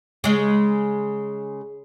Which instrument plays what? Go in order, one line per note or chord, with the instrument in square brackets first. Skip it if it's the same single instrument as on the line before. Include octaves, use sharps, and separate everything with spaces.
[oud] C#3 G#3